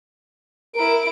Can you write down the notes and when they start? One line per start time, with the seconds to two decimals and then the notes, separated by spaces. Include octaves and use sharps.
0.76 E4 A#4 D7